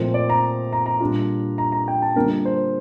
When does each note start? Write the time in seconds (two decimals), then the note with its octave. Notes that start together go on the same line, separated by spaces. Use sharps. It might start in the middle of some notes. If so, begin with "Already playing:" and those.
Already playing: A#2 F3 A3 C4 F4
0.14 D5
0.29 A#5
0.73 A#5
0.86 A#5
1.00 A#2 G3 D4 F4
1.58 A#5
1.72 A#5
1.88 G5
2.02 A5
2.16 D3 G3 A#3 D4 F4 A#4
2.30 A#4
2.45 C5